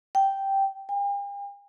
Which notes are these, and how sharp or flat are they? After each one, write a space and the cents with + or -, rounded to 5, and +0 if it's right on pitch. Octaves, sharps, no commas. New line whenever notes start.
G5 -5
G5 +45